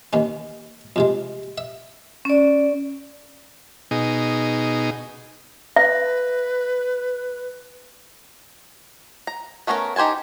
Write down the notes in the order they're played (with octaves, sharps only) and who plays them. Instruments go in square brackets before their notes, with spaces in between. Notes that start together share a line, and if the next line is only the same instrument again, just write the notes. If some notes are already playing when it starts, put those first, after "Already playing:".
[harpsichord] D#2 D#3 C#4
F2 C3 G#3
E5
[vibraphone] C#4 D5
[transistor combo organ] B2 D#4 G#4
[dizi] B4 [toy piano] E5
[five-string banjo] A#5
A3 B3 C#4 D4 A#4
D#4 G4 C5 G#5 A5